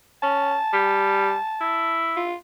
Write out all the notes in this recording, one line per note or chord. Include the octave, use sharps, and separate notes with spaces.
C#4 A5
G3
E4
F4